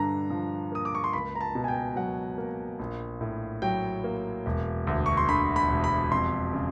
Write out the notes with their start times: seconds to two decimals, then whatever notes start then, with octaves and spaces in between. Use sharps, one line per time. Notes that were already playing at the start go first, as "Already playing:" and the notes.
Already playing: G2 D3 A#5
0.30 F3
0.72 A#3 D#6
0.85 D6
0.95 C#6
1.04 C6
1.13 C#2 B5
1.35 A#5
1.41 A5
1.55 B2
1.64 G#5
1.68 G5
1.96 F#3 F#5
2.38 A#3
2.79 A#1
3.21 A2
3.62 F#3 G5
4.04 A#3
4.46 E1
4.87 D2
5.06 C#6
5.17 C6
5.28 D3 B5
5.56 B5
5.70 E1
5.84 B5
6.11 F2 C6
6.53 C#3